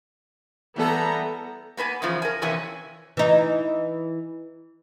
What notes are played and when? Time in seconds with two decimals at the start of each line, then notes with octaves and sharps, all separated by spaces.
0.76 E3 G3 B3 A4 A#5
1.77 A#3 B3 B4 G#5
2.02 E2 C#3 F3
2.22 A#4 G#5
2.42 F2 C3 E3 A#3 C#4 G#5
3.17 E3 D#4